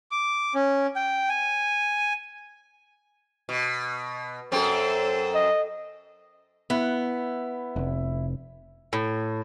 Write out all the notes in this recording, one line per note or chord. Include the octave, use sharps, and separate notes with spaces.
D6
C#4
G5
G#5
B2
F#2 C4 A4
D#5
B3 E4
F1
A2